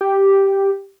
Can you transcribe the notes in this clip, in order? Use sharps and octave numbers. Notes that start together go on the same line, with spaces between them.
G4